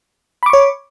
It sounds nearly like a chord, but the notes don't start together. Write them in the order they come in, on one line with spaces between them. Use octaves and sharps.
B5 D6 C#6 C#5